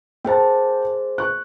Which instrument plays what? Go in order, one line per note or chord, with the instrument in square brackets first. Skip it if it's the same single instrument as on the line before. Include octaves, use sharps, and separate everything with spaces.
[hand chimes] A#3 G#4 C5 [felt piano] G5 A5
[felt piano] C#6 F#6